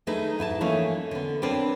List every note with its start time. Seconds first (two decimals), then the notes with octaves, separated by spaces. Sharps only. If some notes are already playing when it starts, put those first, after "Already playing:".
0.07 D#3 A3 D#4 G#4 B4
0.39 G#2 E4 G#5 A5
0.61 E3 F3 A3 A#3 C#4 D#4
1.11 D3 B3
1.42 C4 D4 A#4 B4 C#5 D5